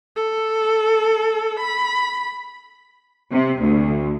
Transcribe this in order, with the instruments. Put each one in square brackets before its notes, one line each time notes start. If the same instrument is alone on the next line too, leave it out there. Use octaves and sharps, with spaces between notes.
[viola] A4
B5
[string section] C3
D2